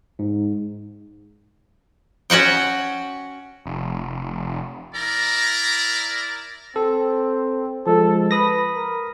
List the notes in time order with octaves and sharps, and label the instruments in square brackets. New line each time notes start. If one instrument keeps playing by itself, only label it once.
[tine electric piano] G#2
[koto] C#4 F#4 F#5 G5
[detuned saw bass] F1
[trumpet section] E4 A#4 D5 A#5
[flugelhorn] C4 [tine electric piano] A4
[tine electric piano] F3 G#3 [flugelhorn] A4
[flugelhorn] B4 [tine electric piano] B5 D#6 A#6
[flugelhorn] A#4